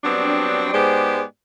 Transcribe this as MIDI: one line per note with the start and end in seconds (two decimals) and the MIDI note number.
0.04 0.68 54
0.04 0.68 55
0.04 0.68 59
0.04 0.68 60
0.04 0.68 62
0.73 1.22 44
0.73 1.22 56
0.73 1.22 59
0.73 1.22 67
0.73 1.22 72
0.73 1.22 74